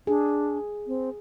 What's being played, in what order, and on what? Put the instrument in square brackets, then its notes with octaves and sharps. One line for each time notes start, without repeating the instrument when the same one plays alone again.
[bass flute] D4 [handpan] G#4
[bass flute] C4